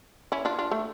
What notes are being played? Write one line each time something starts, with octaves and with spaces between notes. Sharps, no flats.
C#4 E4
D4 F4
D4 F4
A3